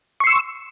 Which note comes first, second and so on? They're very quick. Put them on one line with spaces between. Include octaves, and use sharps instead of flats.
C#6 C6 E6